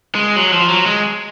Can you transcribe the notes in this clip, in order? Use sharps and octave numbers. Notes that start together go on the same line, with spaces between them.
G#3
F#3
F3
F#3
G#3